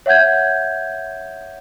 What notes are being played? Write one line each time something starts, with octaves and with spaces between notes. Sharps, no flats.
C#5 E5 F#5 G6 G#6